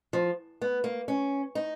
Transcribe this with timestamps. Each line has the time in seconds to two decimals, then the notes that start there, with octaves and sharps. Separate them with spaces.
0.13 F3
0.61 B3
0.84 A#3
1.08 C#4
1.55 D#4